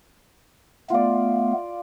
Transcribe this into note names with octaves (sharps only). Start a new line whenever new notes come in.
A3 B3 F4 D5